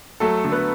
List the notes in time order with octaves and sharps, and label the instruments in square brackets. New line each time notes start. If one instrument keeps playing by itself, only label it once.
[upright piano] F#3 A3 A4
D3
B3 B4